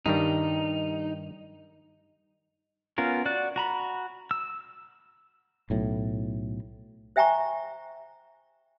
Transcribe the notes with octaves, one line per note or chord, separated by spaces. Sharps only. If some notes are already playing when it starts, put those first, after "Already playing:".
G2 D#3 G3 D#4
B3 C#4 F4 A#4
F#4 D5 F#6
F#4 A#5 B5
E6
B1 A2
C5 E5 G5 G#5 A#5 C#6